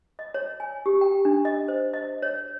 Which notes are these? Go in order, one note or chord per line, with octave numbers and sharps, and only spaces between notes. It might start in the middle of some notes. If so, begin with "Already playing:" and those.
D#5
C#5
G#5
G4
G5
D4
D#5
C5
D#5
C#5